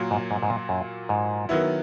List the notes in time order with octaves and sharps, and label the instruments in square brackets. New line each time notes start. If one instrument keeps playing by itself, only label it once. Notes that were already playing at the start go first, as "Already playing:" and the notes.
Already playing: [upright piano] A#2 F#3 A#3
[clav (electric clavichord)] G#2
G#2
G#2
A#2
F#2
G#2
[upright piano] D#3 F#3 B3 E4